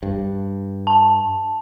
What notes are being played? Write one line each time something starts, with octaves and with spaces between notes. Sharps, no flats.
G2
A5